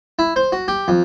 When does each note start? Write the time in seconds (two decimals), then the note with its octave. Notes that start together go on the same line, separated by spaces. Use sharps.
0.19 E4
0.36 C5
0.52 F#4
0.68 G4
0.88 F2